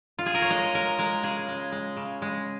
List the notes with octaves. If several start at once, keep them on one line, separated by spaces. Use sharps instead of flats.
F4
G#4
A#4
C#5
G#3 D#5
G#3 A#4
G#3 A#4
C#3 G#4
G#3
G#3
C#3
G#3